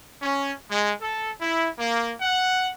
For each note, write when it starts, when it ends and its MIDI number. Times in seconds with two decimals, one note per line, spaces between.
0.22 0.52 61
0.69 0.93 56
1.02 1.31 69
1.40 1.70 64
1.78 2.14 58
2.22 2.72 78